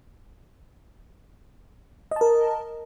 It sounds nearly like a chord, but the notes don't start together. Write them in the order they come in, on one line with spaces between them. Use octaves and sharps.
D#5 A5 A#4